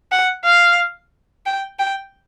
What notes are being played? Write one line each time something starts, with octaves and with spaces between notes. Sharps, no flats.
F#5
F5
G5
G5